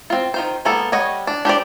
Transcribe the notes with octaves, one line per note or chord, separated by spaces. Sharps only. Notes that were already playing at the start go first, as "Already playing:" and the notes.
C4 F4
D#3 F4 C5
G#3 A#3 B3 A4
G3 C#5 D#5 F#5
D4
D4 G4 C5 D5